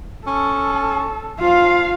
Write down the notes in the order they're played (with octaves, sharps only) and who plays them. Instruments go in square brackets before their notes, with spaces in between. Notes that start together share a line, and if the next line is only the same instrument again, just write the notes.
[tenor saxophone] C#4 [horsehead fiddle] A4
[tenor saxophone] F3 [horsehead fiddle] F4 F5